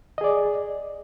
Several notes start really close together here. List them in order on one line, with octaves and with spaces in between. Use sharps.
D#5 G#4 D5